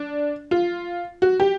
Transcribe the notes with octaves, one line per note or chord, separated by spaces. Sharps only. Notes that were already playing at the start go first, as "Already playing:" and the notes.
Already playing: D4
F4
F#4
G4